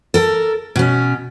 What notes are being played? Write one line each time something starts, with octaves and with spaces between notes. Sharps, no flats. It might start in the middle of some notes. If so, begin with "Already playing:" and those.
A4 A#4
B2 C#4